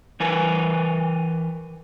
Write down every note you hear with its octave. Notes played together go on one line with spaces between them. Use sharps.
E3 A#4 B4 G#5